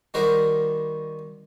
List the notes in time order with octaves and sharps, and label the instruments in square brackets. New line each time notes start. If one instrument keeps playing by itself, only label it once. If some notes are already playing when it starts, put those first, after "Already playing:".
[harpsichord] D#3 G3 F#4 A#4 C5